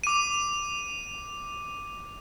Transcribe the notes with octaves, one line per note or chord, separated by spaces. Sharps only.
D6 D#7